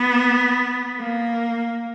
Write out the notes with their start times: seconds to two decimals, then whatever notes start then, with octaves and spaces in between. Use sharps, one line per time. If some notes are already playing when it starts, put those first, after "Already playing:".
Already playing: B3
0.99 A#3